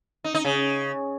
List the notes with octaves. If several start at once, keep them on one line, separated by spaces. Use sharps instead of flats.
D#4
D#4
C#3